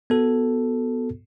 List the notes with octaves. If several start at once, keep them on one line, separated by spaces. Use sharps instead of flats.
B3 F#4 A4